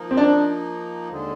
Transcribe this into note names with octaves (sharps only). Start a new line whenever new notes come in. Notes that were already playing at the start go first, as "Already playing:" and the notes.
Already playing: F3 A#3 D#4
C4
D4
D#2 D3 G#3